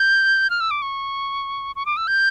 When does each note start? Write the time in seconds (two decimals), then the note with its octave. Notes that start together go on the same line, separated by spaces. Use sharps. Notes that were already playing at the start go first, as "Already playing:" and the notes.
Already playing: G6
0.50 F6
0.60 E6
0.71 D6
0.82 C#6
1.76 C#6
1.86 D6
1.97 E6
2.07 G6